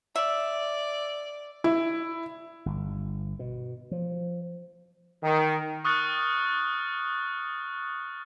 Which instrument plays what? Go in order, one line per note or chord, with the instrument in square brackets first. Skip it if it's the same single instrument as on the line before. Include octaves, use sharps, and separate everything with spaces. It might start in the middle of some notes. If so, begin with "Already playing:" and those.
[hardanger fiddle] D5 [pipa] E5
[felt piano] E4
[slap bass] G1
B2
F3
[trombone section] D#3
[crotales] C#6 D#6 F6 F#6 A6 C#7